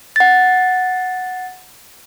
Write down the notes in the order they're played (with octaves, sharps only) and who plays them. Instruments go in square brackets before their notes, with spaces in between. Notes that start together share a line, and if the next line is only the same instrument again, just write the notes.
[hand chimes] F#5 A6